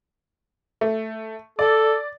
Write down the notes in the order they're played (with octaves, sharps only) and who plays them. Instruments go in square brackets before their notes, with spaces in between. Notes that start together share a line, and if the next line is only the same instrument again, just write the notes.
[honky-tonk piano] A3
[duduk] A4 [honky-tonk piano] D5